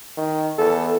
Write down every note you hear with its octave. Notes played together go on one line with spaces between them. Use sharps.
D#3
E2 A4